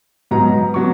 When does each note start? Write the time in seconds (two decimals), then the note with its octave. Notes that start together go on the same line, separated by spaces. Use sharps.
0.31 G#2 F#3 B3 A#5
0.74 F#3 B3 C#6